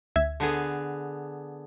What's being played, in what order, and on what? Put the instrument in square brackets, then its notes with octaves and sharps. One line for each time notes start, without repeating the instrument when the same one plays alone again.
[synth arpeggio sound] D2 E5 G#6
[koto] D3 B3 G#4